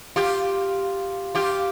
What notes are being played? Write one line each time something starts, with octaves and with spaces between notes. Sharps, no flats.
F4 G4
F4 G4